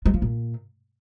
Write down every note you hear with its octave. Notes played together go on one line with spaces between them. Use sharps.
G#3
F3
A#2